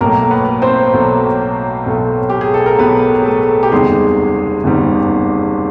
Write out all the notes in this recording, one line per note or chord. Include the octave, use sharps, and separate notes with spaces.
B1 A2 F#3 A3 A#3 A#4
B3 B4
C4 C5
B1 A2 F#3 A3
B1 A2 F#3 A3
G4
G#4
A4
A#4
B1 A2 F#3 A3 B3 B4
G#4
A3 A4
G4
F#1 E2 C3 D#3 G3 G#3 G#4
F#1 E2 C3 D#3 G3